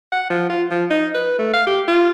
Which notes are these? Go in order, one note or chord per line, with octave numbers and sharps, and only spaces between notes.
F#5
F3
F4
F3
D#4
B4
A3
F5
G4
F4